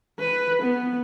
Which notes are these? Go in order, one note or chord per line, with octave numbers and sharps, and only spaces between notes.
B4
B3